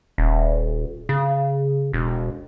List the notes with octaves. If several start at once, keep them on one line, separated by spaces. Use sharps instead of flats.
D#1
C#3
E1